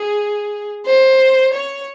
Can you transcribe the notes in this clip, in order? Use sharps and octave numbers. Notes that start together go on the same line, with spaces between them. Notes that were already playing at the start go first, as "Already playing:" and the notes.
Already playing: G#4
C5
C#5